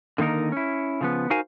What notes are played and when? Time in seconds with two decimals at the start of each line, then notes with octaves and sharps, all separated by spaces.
0.18 D3 D#3 A#3 D#4 A#4
0.52 C#4 E4
1.01 C#3 F3 B3
1.30 D#4 F#4 A#4 C5 F5 G#5